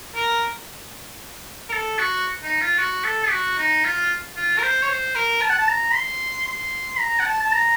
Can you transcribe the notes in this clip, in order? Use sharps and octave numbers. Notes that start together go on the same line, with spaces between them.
A#4
A#4
A4
F#4
D#4
F4
F#4
A4
F#4
D#4
F4
F4
A#4
C5
C#5
C5
A#4
A5
F#5
A5
A#5
C6
C6
A#5
F#5
A5
A5
A#5